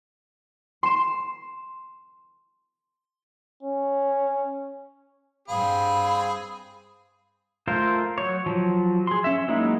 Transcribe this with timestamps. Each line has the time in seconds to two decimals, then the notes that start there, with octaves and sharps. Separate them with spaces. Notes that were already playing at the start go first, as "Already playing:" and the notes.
0.83 C6 E7
3.63 C#4
5.48 G2 G3 C4 G#4 F5 B5
7.68 A3 F4 A#4 C5
8.18 F#3 C#5
8.46 F3 F#3
9.07 G#4 C6
9.24 C#4 E5
9.48 F#3 G#3 A#3 D#4 E4